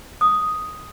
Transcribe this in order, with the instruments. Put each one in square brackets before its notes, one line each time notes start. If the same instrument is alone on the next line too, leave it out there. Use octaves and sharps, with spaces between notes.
[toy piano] D#6